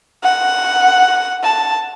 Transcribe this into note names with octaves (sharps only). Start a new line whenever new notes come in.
F#5
A5